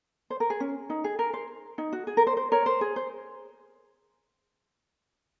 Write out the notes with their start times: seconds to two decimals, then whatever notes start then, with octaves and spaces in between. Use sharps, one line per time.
0.30 C5
0.40 A#4
0.50 G#4
0.60 C#4
0.90 D#4
1.04 G#4
1.19 A#4
1.34 C5
1.78 D#4
1.93 F#4
2.07 G#4
2.17 A#4
2.27 C5
2.37 C5
2.52 A#4 C#5
2.66 C5
2.81 G#4
2.96 C5